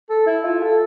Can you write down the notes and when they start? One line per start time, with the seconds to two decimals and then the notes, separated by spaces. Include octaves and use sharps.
0.09 A4
0.26 E4
0.44 F4
0.62 A4